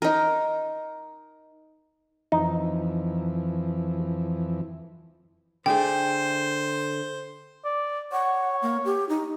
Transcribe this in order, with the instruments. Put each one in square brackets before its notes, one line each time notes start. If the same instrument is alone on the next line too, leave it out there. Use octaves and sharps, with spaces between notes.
[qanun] D#4 A#4
[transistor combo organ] F2 E3 [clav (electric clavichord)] D#4
[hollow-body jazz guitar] D3 A3 G#4 [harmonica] C5 [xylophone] G5
[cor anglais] D5
[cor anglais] C#5 [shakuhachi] F#5
[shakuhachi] A#3
G4
D#4